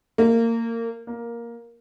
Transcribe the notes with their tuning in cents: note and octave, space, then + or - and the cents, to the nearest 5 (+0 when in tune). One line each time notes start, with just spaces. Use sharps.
A#3 -25
A#3 +5